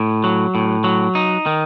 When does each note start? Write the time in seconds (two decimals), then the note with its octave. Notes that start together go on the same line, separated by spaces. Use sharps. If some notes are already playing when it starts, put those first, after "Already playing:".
Already playing: A2
0.24 F#3
0.55 A2
0.84 F#3
1.15 D#4
1.46 D#3